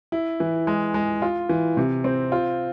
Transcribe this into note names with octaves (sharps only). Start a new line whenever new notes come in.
E4
E3
G#3
G#3
F4
E3
C3
C4
F4